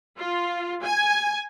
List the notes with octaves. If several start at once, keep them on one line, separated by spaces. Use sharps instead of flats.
F4
G#5